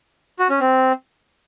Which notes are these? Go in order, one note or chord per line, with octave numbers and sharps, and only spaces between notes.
F#4
C#4
C4